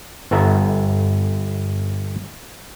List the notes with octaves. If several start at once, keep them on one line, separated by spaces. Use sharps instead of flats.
G1 B3 A4 E5 A#5